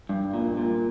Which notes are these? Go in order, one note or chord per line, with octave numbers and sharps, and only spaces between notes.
G2
A#2
A#2